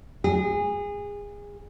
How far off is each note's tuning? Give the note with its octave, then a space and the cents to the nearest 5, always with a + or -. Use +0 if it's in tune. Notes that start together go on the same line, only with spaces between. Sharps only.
G#4 -25